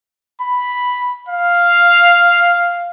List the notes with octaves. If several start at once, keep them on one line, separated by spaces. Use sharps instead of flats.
B5
F5